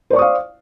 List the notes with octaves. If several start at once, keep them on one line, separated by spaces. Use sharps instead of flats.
C5 D5 F5 C#6 D#6